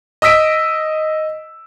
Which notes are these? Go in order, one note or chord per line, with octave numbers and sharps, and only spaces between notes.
D#5 D#6 E6 B6 D7